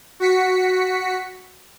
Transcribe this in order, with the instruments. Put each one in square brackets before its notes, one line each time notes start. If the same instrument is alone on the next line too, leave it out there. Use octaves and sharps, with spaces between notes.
[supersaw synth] F#4 B6 C#7